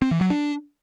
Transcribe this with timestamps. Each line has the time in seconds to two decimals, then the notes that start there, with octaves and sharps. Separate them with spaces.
0.02 C4
0.11 E3
0.21 F#3
0.30 D4